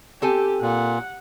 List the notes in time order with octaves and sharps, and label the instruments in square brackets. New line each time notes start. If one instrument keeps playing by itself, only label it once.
[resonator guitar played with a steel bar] C4 A4 G#5 [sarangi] G4
[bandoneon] A#2 [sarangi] F#5